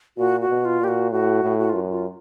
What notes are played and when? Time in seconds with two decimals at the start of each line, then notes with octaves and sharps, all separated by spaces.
0.18 A#2 F#4
0.41 F#4
0.49 B2
0.65 F4
0.80 A#2 G4
0.88 F#4
1.11 A2 F#4
1.43 A2
1.59 F#4
1.69 F#2 F4
1.90 F4